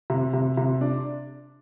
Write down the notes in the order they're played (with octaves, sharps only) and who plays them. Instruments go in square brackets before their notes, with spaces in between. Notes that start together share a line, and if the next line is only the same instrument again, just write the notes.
[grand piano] C3
C3
C3
D4